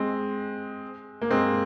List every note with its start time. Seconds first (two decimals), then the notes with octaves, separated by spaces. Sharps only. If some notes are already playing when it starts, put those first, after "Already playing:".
Already playing: G#3 C4
1.21 A#3
1.31 G#3 C4